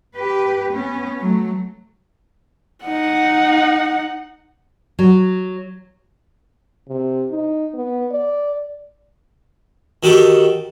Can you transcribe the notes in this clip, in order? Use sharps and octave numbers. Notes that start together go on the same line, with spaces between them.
G4 B4
B3 C#4
F#3 A3
D#4 F#5
F#3
C3
D#4
B3
D5
D#3 F#4 G4 A4